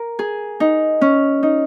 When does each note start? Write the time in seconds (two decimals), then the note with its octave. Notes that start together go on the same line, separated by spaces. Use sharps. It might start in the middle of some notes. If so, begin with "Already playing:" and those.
Already playing: A#4
0.19 G#4
0.60 D#4
1.01 C#4
1.43 D#4